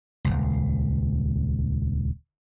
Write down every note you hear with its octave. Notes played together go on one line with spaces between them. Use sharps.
D#1 G#1 C#2